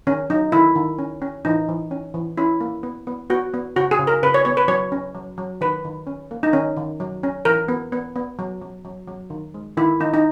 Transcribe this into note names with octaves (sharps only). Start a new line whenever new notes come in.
D#3 C#4
F#3 D#4
D#3 E4
D#3
C#4
C#4
E3 D#4
E3
C#4
E3
C#4 E4
A#3
B3
B3
B3 F#4
B3
C#3 F#4
G#4
C#3
A#4
C#3 B4
C#5
B3 C#5
B4
F#3 C#5
C#4
F#3
F#3
D#3 B4
D#3
C#4
A#3
D#4
D#3 C#4
D#3
F#3
C#4
E3 A#4
B3
B3
B3
F#3
F#3
F#3
F#3
D#3
G#3
D#3 E4
D#3 D#4
D#4